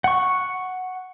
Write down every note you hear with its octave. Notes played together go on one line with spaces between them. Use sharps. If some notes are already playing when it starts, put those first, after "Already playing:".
F#5 C#6